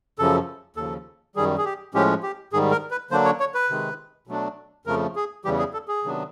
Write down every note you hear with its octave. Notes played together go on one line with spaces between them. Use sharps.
F#2 C#3 F3 A4
D#2 C#3 F3 A4
F#2 D#3 G3 G#4
G#4
G4
A2 F3 G#3 C#4 G4
G4
G#2 D#3 G3 G#4
A#4
B4
D3 F#3 A#3 D4 C5
C#5
C#5
B4
C3 D#3 G#3
B2 F#3 A3 D4
F2 C#3 F3 A3 A#4
G#4
E2 C#3 E3 G3 G4
G#4
A4
G#4
C3 D#3 F#3 B3 D4